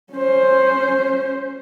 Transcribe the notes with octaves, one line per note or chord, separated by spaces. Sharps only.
C#4 C5